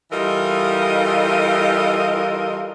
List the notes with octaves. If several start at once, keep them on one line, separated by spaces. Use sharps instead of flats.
E3 G3 F4 A4 A#4 D#5